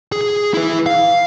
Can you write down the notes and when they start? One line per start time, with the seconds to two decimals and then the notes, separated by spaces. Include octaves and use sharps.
0.12 G#4
0.54 E4 B4
0.86 F5